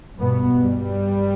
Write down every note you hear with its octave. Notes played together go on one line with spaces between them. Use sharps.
G2 B2 B3
G2 G3